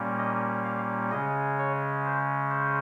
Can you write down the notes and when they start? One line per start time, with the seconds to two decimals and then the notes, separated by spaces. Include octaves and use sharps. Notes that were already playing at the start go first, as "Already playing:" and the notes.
Already playing: A#2 G3 A#3 C#4
0.18 D#5
0.65 F5
1.11 C#3 G#3 C#4 D#5
1.59 C#5
2.05 C5
2.51 C5